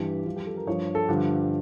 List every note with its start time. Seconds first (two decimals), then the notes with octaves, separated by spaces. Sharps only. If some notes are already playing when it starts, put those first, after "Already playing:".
Already playing: G2 E3 G4
0.26 G2 F3 F4
0.36 G4
0.47 A4
0.57 A#4
0.67 G2 F3 C#5
0.95 A4
1.08 G2 D3 F3 G4